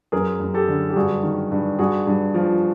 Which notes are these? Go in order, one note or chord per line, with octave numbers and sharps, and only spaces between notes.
F#2 G#4 A#4
F#2
G4 A4
D3
G4
G2 F#4 G#4
D#3
G2
G2 F#4 G#4
G2
F3